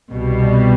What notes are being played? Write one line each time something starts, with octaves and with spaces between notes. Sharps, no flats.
C2 B2 G3